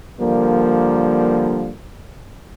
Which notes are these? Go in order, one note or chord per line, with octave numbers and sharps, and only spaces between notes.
D3 F3 G3 A#3